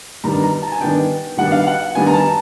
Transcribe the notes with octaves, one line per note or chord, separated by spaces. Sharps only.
D#3 G3 B3 D4 A#5
A#5
A5
G#5
D#3 G3 B3 D4 G5
D#3 G3 B3 D4 F#5
F5
F#5
D#3 G3 B3 D4 G#5
A#5
A5